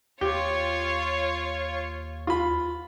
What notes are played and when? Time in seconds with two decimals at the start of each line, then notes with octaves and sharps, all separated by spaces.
0.21 D#2 F4 G4 C#5
2.27 F4 B5